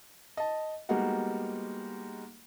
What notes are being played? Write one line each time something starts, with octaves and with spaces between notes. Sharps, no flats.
D#5 A5
G3 G#3 A#3 B3 D#4 F#4